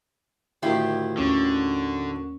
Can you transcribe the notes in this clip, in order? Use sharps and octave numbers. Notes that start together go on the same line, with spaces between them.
D2 A2 D#3 E4 F4 G4
D#2 D3 C#4 C#6